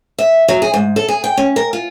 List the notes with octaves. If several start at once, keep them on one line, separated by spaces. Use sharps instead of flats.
E5
F#3
G#4
G#2
A4
G#4
G5
C#4
A#4
F4